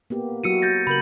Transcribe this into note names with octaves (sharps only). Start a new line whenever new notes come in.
A#3 B3 G4
F#3 E4 F#4 E6 C#7 D#7
G6 A6 A#6
C#3 A#4 B5 G6 F#7